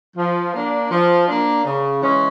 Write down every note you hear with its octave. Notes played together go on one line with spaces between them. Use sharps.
F3
A#3 D4
F3
A#3 D4
C#3
E3 G#3 C#4